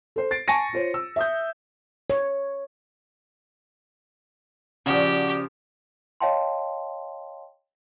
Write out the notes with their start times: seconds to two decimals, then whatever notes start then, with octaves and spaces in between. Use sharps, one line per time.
0.16 A4 C5
0.31 A6 C7 D7
0.48 G#5 A5 C#6 A#6 C#7 D#7
0.73 F4 C5 C#5
0.94 E6
1.16 E5 D#6 G6
2.10 C#5
4.86 A#2 C#3 F3 F#4 G4 D5
6.20 C#5 D#5 F5 G5 A5 C6